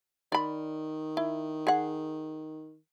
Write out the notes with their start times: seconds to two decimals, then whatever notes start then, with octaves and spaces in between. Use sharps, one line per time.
0.32 D#3 D5 B5
1.17 E4
1.67 G#4 F#5